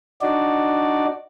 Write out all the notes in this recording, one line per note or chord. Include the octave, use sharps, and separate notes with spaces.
D4 D#4 F#4 D5